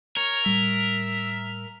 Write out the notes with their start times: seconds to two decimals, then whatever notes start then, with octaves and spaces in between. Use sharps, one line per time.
0.17 A#4 C#5
0.46 A2 G3 E5